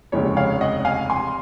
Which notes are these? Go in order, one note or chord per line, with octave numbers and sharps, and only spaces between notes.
F1 D#2 C#3 G#3 C#5
C#5 F5
D#5 F#5
F5 G#5
G#5 C6